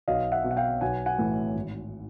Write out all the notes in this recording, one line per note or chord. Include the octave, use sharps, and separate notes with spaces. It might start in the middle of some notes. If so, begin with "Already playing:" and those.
B1 D#5 F5
E5 F#5
B2
F#5
F5 G5
B1 F#5 G#5
F#5 G#5
A2 E3
G#1